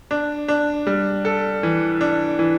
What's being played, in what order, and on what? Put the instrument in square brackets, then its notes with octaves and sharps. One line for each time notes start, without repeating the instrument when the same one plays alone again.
[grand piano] D4
D4
G3
A4
E3
D4
E3